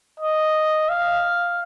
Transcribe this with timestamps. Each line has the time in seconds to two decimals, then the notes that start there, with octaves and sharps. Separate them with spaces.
0.20 D#5
0.89 F5